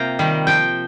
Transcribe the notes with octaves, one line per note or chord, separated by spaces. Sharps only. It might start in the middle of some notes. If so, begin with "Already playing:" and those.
Already playing: C3 A#3 F4 F5 G5 A#5
D#3 G3
F3 G5